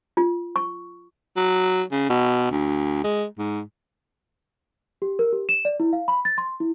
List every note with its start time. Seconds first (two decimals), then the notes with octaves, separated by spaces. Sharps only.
0.17 F4
0.56 C#6
1.36 F#3
1.91 C#3
2.09 B2
2.51 D2
3.04 G#3
3.38 G#2
5.02 G4
5.19 A#4
5.33 G4
5.49 E7
5.65 D5
5.80 E4
5.93 F5
6.08 B5
6.25 A6
6.38 C6
6.60 E4